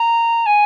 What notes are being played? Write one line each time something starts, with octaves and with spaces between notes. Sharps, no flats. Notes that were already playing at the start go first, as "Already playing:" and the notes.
Already playing: A#5
G#5